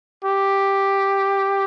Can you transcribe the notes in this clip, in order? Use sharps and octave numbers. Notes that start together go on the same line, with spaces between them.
G4